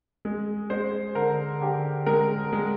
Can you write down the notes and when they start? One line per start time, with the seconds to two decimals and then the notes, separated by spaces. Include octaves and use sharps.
0.25 G#3
0.70 G#3 C5
1.15 D3 A#4
1.61 D3 G4
2.06 G#3 A#4
2.53 G#3